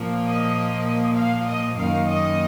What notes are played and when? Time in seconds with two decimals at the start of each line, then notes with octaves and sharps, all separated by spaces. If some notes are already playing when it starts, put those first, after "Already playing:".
Already playing: A#2 F3 A#3
0.25 D#5
1.15 F5
1.46 D#5
1.76 F#2 D#3 A#3 D#4 F5
2.06 D#5